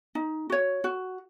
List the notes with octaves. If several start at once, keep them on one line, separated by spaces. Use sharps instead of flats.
D#4
F#4 C#5
F#4